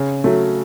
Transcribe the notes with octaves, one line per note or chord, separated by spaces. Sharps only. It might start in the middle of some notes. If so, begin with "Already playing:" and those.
Already playing: C#3
F#3 A3